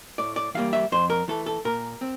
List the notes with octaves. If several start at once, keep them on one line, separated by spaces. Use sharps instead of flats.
A2 D5
D5
E3 G3 A#3 F5
E5
F2 C5
A#4
E3 A3 A4
A4
A#2 A#4
C4